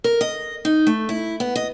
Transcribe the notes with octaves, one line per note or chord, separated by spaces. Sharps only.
A#4
D#5
D#4
A3
E4
B3
D#5